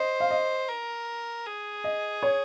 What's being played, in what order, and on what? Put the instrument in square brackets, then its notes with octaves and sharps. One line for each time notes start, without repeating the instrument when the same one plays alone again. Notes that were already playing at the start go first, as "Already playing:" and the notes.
Already playing: [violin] C5 [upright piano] D#5
[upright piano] F5
D#5
[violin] A#4
G#4
[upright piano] D#5
C#5